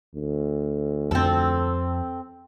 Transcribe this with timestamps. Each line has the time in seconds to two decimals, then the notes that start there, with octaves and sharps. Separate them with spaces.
0.15 D2
1.11 F2 F3 C4 A4